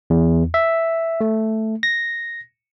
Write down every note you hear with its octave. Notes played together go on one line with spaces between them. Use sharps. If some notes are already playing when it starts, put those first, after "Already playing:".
E2
E5
A3
A#6